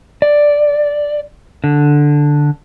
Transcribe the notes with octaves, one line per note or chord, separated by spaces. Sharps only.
D5
D3